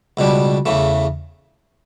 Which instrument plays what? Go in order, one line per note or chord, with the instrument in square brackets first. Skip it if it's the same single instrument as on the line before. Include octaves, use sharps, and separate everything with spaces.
[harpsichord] C#2 B2 G3 D4
E2 C#3 E3 A3